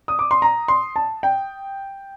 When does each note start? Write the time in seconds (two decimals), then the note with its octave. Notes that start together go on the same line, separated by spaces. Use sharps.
0.08 D#6
0.19 D6
0.31 C6
0.42 A#5
0.68 C6
0.96 A5
1.23 G5